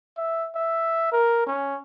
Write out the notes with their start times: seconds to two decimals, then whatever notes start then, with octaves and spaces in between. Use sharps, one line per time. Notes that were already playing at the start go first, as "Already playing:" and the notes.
0.17 E5
0.55 E5
1.12 A#4
1.47 C#4